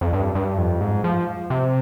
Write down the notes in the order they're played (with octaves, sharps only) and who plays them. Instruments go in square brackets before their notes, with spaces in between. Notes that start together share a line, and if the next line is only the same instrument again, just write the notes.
[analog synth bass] F2
G2
G2
F2
G#2
F3
C3